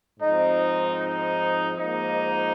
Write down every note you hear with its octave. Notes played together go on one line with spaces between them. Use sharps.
G#2 F3 C4 D#4
D#4
G#2 F3 A#3 D#4